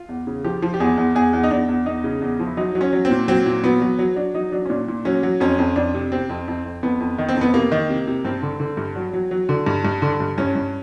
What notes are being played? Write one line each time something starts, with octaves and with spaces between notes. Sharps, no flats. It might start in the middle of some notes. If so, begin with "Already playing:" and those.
Already playing: F4
E2
C#3
F3 G4
F3
G4
E2 G#4
E2
E2 G#4
E2
D#4
E2 D4
E2
E2 D#4
C#3
E2
F3
E4
F#3 D#4
F#3
C#4
F#3
C4
A#2
F#3 C4
A#2
F#3 B3
F#3
F#3
F#3 D4
F#3 D#4
F#3 D4
C#4
A#2 D4
A#2
F#3 C#4
F#3
F2 C#4
F2
F2 D4
C3
C3 C4
F2
F2
F2
F2 B3
F2
D#3
C4
F2
B3
C3 A#3
D#3
C3
C3
G2 C4
D3
D3
G2
F#3
F#3
F#3
D3
G2
G2
D3
G2
G2 C#4
G2